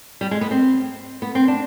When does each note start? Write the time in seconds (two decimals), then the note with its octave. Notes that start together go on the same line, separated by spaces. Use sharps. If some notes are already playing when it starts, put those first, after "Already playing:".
0.21 G3
0.31 G#3
0.41 B3
0.51 C4
1.22 B3
1.35 C4
1.48 D4